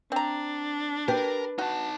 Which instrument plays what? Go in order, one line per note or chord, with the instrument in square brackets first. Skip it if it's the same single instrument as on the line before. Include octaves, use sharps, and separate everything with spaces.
[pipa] C4 A#5 [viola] D4
[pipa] G4 [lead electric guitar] A#4 [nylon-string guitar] B4
[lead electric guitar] D#4 A5 [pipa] F#4